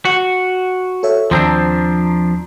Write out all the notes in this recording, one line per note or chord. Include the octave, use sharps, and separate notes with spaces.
F#4
A4 C#5 E5
D#2 F3 C4 D4 A#5 C7